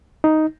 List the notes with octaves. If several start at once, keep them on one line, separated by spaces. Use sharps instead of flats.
D#4